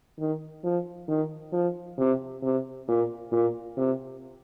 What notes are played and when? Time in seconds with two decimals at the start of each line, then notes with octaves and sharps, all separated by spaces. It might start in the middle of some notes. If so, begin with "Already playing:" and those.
0.19 D#3
0.64 F3
1.08 D#3
1.53 F3
1.98 C3
2.43 C3
2.88 A#2
3.32 A#2
3.77 C3